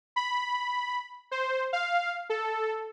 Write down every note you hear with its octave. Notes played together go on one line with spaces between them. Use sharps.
B5
C5
F5
A4